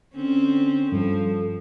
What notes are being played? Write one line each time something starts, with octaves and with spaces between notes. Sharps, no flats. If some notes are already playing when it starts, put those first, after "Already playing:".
D3 C4 C#4
G2 F3 A4